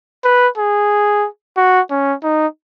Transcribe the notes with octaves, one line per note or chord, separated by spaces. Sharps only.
B4
G#4
F#4
C#4
D#4